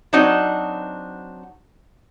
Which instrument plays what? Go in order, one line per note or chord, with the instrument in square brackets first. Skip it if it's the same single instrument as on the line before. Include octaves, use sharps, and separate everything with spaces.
[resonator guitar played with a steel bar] F#3 C4 D4 D#4 F#4